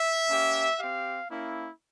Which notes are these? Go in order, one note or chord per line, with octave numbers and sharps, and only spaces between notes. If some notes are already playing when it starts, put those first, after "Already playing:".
Already playing: E5
A#3 C#4 G4
C4 G4 F5
A#3 C#4 E4